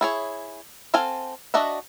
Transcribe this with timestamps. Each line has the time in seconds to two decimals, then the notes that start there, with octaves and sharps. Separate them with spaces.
0.01 E4 G#4 C#5
0.94 C4 A4 F5 G#5
1.54 D4 F#4 D#5 E5